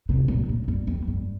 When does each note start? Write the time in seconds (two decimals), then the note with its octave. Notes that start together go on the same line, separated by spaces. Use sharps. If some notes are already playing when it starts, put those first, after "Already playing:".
0.09 C3
0.28 A#2
0.49 A2
0.68 G2
0.87 F2
1.08 G2